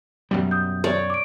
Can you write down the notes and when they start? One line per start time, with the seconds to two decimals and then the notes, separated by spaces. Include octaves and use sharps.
0.31 F#2 B2 G3
0.51 D#6 G6
0.84 C#5 D5
1.10 D6 D7